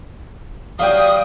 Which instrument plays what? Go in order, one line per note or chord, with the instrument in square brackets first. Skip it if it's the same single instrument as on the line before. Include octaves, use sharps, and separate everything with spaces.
[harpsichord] F#3 G3 F#4 [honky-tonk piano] F5 G5 [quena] D#6